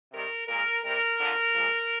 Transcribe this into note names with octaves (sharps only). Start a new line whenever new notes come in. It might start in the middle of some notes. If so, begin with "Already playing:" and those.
C3 D#3 G3 A#4
A#2 G#3 A#4
C3 G3 A#4
F2 D3 F3
A#2 F3 G#3